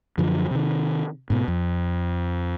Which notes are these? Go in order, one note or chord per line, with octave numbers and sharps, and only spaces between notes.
F#2 D3 F3 F#3
C3 D#3
G#2 B2
F2